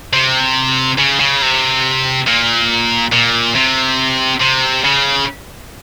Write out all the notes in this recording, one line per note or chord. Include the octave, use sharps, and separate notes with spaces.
C3
C#3
C#3
C3
A#2
A#2
C3
C3
C#3